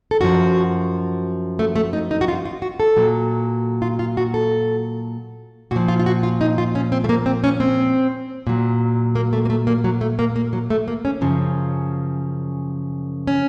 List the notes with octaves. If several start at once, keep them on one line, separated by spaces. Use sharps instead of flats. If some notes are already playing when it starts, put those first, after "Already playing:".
A4
F#2 F3 F#4
A3
A3
D#4
D#4
F#4
F4
F4
F#4
A4
A#2 F#3
F4
F4
F#4
A4
A#2 F3 F#4
F4
F4
F#4
F4
D#4
F4
C#4
C4
A3
A#3
C4
C#4
C4
A#2 F#3
A#3
A3
A#3
A3
A#3
F#3
A3
A#3
A#3
F#3
A3
A#3
C#4
F#2 C#3 F3
C#4